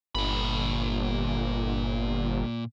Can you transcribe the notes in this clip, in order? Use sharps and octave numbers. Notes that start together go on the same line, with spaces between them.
G1 A#2 B5